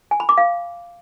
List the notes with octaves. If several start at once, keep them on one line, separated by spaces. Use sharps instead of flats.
G#5
B5
D6
F5